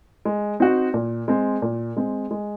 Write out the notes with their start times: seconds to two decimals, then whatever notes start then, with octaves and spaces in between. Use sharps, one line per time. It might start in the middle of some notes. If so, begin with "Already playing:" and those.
0.25 G#3
0.60 C4 D#4 F#4
0.94 A#2
1.28 G#3 C4
1.62 A#2
1.97 G#3 C4
2.31 G#3